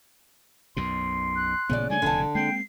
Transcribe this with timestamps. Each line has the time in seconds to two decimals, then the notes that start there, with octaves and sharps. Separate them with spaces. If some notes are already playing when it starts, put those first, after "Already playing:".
0.77 B1 F#2 B2 C6
1.36 F#6
1.69 A1 A#2 C#3 B3 D5
1.90 G3 A3 D4 G#5
2.02 F1 E2 B2 D3 D4 A5
2.35 G#3 A#3 C4 G5 C7